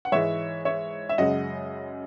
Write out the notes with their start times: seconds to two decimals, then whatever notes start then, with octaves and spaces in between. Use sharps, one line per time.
0.05 F#5
0.12 G#2 E3 G#3 C#5 E5
0.65 C#5 E5
1.09 E5
1.18 F#2 C#3 G#3 D#5 F#5